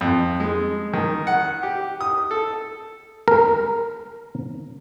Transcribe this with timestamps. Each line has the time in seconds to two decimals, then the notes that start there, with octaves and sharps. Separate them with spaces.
0.01 F2
0.40 G#3
0.94 D#3
1.27 F#5
1.63 G4
2.01 D#6
2.31 A4
3.28 A#4